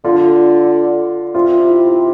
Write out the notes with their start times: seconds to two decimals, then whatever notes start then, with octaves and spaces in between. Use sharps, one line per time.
0.04 D3 F4
1.34 C3 F4
1.67 E4